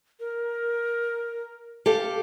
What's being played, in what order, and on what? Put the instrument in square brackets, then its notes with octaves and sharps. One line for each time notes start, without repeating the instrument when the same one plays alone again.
[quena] A#4
[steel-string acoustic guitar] G4 A4 F5